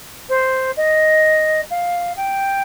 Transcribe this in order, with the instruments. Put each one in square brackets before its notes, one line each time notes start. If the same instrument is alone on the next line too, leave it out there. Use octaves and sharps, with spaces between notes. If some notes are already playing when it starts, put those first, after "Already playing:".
[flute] C5
D#5
F5
G5